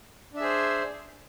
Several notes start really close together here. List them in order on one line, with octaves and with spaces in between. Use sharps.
D4 E5 G#4 C5